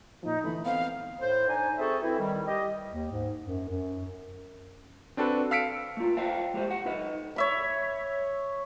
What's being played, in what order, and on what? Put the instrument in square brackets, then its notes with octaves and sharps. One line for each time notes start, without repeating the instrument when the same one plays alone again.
[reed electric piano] A#2 F3 [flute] D#4
[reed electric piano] D3 E3 A3 [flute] B5
[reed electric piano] B3 C4 [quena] F5
[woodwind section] A2 C5
D4 D#4 C5 G#5
C4 F#4 G#4 A4 E5
E3 C4 E4
D#3 G3
G4 D#5
[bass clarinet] D#2
G#2
F#2
F#2
[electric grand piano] C4 D4 F#4 A4 B4
F5 E6 B6 C#7 D7
[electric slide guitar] A3 F4
C5 D5 F5 G5
G#3 G4 A#4 C5
G4 F#5
D#4 B4 D#5
[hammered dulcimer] C#5 E5 B5